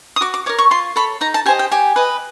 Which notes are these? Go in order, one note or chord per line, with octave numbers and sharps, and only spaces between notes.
D#6
F#4 D6
D6
A#4 C#5 D6
C#6
F4 C6
A4 C#5 B5
D#4 A#5
A5
G4 C5 D#5 G#5
G5
G4 G#5
B4 D#5